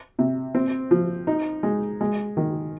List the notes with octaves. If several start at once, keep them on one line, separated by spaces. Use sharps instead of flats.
C3
C4
F3
D#4
G#3
G#3
D#3